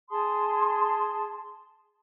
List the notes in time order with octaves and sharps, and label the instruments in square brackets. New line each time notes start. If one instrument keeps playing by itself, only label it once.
[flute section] G#4 A5 C6 D#6